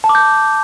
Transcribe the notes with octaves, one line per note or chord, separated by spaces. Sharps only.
A5
D6
G6